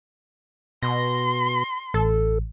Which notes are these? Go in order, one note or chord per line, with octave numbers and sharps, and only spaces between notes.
B2 C6 A#6
A1 A4